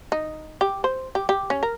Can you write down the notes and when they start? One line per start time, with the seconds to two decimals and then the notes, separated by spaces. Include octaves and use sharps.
0.12 D#4
0.61 G4
0.84 C5
1.15 G4
1.29 G4
1.50 C#4
1.63 A#4